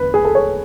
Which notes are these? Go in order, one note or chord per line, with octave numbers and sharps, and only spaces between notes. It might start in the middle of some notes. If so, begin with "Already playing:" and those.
Already playing: E2 D3 B4
G#4
A4
C#5